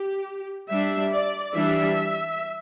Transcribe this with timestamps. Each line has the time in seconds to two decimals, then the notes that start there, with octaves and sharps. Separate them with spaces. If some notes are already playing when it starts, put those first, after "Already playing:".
Already playing: G4
0.69 G3 D4 E5
1.12 D5
1.54 E3 G3 D4 E5